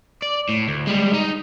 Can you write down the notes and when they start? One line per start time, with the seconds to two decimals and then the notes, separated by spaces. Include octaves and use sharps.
0.22 D5
0.49 A2
0.68 D2
0.87 G3 G#3
1.13 D#4